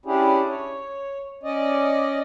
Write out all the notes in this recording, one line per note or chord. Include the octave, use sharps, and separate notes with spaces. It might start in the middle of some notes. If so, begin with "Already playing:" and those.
C#4 D4 E4 G4 G#4
C#5
C#4 D5 D#5